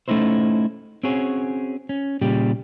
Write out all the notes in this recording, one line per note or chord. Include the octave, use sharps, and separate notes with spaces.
A3 C#4 D#4 E4 C5
C4 C#4 F#4 G#4 C#5
C#4
A#2 C#3 G3 G4